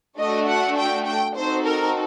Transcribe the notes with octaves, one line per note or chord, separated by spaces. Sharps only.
A3 D4 F#4 A4 D#5
F#5
G5
G5
C4 D#4 F#4 A4 C5
A#4